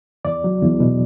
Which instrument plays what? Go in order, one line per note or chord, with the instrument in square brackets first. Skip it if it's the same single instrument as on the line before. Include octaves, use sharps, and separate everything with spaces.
[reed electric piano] E2 D5
F#3
E2
B2